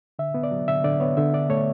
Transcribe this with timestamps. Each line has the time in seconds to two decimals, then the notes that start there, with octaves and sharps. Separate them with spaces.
0.19 D3 E5
0.34 B3
0.43 D5
0.51 F#3
0.68 D3 E5
0.84 D3 D5
1.00 B3 C#5
1.17 D3 E5
1.33 D4 D5
1.50 A3 C#5